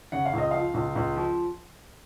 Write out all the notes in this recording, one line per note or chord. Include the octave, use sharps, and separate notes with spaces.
C#3 F#5
F5
C#2 D#5
F3 F5
C#2
C#2
F3